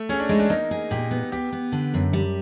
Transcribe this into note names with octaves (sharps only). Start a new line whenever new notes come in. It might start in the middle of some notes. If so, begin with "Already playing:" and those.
Already playing: A3
C#4 G#4
D4
G#3 D#4
D4
A#3 D#4
G#4
A#2 G4
B3
B3 G4
B3
D3
F#2
G3